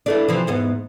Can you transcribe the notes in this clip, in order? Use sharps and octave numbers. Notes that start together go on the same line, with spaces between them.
E3 A3 D4
C3 E3 F3
E2 G#2 B3